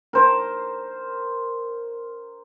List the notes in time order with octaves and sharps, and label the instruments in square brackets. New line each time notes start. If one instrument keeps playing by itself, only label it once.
[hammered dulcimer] A#4 C5